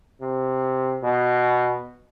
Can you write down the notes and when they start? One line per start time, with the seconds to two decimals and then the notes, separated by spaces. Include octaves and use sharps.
0.21 C3
1.04 B2